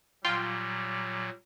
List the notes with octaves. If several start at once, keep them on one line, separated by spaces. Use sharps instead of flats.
A#2 F#3 G3 F4 G5 C6